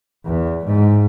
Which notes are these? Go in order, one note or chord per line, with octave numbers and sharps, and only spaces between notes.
E2
G#2